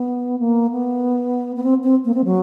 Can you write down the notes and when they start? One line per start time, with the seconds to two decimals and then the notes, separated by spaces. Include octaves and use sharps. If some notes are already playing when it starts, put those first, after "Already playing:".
Already playing: B3
0.39 A#3
0.71 B3
1.56 B3
1.63 C4
1.84 C4
2.05 A#3
2.14 C4
2.25 F#3